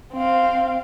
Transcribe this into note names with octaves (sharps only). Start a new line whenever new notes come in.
C4 F5